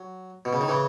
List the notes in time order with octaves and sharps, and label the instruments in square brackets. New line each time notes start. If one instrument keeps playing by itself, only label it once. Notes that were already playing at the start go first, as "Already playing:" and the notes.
Already playing: [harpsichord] F#3
B2
C#3
D#3
C#3 E3